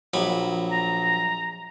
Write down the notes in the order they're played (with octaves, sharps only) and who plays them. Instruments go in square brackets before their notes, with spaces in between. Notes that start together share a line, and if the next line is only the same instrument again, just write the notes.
[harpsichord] A#1 F#3 B5
[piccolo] A#5